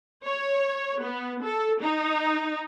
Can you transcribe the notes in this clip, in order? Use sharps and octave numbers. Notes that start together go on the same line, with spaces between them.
C#5
B3
A4
D#4